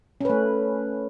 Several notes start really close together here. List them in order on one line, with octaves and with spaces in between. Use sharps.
C#4 B4 A3